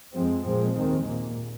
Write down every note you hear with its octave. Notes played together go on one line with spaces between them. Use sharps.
F2 F3 G#3 C4
A#2 F3 G#3 C4
D#2 D#3 G#3 C4
A#2 A#3